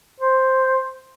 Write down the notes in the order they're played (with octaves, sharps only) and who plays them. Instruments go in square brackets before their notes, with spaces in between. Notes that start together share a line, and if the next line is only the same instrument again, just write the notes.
[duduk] C5